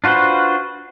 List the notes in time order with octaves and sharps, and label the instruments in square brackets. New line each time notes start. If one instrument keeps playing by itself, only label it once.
[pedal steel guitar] D4 F4 F#4 B4 C5